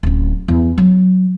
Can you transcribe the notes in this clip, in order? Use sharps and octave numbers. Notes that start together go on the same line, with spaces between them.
D1 C#4
E2
F#3